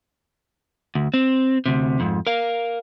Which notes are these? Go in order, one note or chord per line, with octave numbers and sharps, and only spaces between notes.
D2
C4
D2 C3
F2 G#2
A#4 F5